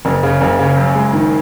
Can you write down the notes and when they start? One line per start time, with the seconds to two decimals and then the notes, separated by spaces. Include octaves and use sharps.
0.05 F#1
0.23 C#3
0.41 F#1
0.59 C#3
0.77 F#2
0.95 G#3
1.13 D#3